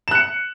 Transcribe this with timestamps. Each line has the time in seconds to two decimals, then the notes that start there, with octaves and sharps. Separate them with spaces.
0.08 E7
0.11 F#6
0.15 C#7